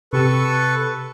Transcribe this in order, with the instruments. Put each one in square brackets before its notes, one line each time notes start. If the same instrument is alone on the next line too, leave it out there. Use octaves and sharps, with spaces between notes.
[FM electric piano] C3 G4 E6 [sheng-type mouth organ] A4 B4 C#6